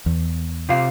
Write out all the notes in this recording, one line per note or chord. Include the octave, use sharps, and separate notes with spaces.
E2
C3 F4 F5